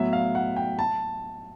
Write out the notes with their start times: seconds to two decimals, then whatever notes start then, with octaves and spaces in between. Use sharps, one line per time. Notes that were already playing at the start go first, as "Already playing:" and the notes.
Already playing: A2 F#3 B3 E5
0.13 F5
0.35 F#5
0.56 G5
0.79 A5